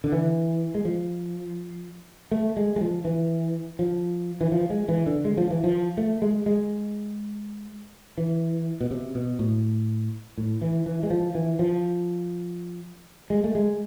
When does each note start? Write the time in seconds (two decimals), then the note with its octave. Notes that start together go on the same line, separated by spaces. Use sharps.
0.04 D3
0.12 E3
0.75 G#3
0.85 F3
2.31 A3
2.57 G#3
2.76 G#3
2.81 F3
3.05 E3
3.79 F3
4.41 E3
4.52 F3
4.70 G#3
4.88 E3
5.06 D3
5.25 G#3
5.37 F3
5.50 E3
5.64 F3
5.97 A3
6.22 G#3
6.46 G#3
8.18 E3
8.81 B2
8.91 C3
9.15 B2
9.39 A2
10.38 A2
10.62 E3
10.86 E3
11.03 G#3
11.10 F3
11.35 E3
11.59 F3
13.30 G#3
13.44 A3
13.55 G#3